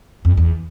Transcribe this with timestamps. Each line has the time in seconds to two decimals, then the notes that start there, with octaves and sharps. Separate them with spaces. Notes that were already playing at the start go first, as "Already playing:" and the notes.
0.25 F2
0.37 E2